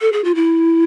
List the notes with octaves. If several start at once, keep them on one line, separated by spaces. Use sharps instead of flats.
A4
G#4
F4
E4